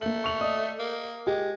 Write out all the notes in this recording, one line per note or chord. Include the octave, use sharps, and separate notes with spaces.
A3 A#3 F#7
C#6 F7 F#7
D5 D#5 D#6
A#3
G#3 G4